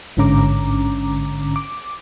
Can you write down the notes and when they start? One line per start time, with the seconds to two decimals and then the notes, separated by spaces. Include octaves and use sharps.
0.17 A1 G#2 D3 C#4 A#5 D6
1.56 D6